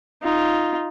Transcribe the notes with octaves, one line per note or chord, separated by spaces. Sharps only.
D#4 F4